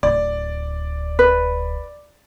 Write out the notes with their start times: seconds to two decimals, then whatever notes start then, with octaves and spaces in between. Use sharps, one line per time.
0.03 D1 D5
1.19 B4